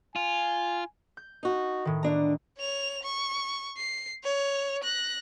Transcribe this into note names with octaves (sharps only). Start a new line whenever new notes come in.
F4 G#5
G6
D#4 F#4
A2 D#3
D3 D4 A#5
C#5 F7
C#6
C7
C#5 F7
F#6 A#6